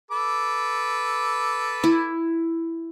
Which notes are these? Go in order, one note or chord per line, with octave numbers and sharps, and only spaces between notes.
A4 B4 D6
E4